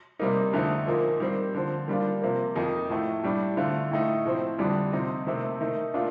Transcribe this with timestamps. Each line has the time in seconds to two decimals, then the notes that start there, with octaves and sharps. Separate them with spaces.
0.19 C3 G3 A#3 D#4
0.53 F2 D3 A3 C4 D#4
0.87 A#2 F3 A#3 D#4
1.20 D#3 G3 C4
1.55 D3 F3 C4
1.88 D#3 G3 D4 F4
2.22 C3 F3 A#3
2.55 F2 D#3 A#3 D#4
2.89 A2 F3 A3
3.23 A2 G3 D4
3.57 D3 A3 C4 F4
3.91 A2 A3 D#4
4.25 A2 F3 C4
4.58 F2 D3 G3 D4
4.92 C3 F3 C4 D#4
5.27 C3 D#3 A3 C4
5.61 D#3 A3 D#4
5.94 A#2 A3 D4 F4